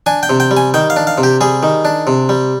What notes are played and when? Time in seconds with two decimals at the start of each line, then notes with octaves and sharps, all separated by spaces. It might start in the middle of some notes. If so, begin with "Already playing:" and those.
0.06 D4 G#5
0.23 G5
0.29 C3
0.40 G5
0.51 G3
0.57 G#5
0.74 D#3 G5
0.90 F5
0.96 D4
1.07 F5
1.18 C3
1.23 G4
1.41 G3 G#4
1.63 D#3
1.85 D4
2.07 C3
2.29 G3